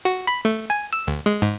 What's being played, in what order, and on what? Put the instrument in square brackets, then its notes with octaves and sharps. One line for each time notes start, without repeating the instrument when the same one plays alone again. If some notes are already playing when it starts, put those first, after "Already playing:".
[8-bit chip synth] F#4
B5
A3
G#5
E6
D2
G#3
G#2